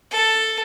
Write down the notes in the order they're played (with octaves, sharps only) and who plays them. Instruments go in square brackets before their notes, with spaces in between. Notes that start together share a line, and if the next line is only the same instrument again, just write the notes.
[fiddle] A4